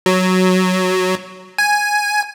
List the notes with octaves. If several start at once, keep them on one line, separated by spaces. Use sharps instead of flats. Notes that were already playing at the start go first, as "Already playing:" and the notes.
F#3
G#5